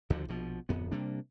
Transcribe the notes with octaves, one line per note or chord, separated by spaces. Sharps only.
D2 D3 F3
A#1 B2 F3
D1 F2 B3
C3 G3 A#3 D4